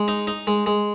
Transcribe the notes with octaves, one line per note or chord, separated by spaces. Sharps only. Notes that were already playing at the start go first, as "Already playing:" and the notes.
Already playing: G#3
D#4
D#4
G#3
G#3